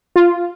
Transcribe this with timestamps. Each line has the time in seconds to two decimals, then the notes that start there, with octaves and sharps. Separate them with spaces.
0.16 F4